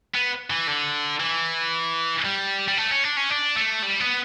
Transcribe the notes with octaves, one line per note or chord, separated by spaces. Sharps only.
B3
E3
D3
E3
G3
G3
A3
C#4
D4
C#4
D4
A3
G3
B3